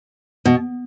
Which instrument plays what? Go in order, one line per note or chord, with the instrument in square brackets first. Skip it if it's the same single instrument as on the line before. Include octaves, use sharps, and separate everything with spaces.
[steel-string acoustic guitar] B2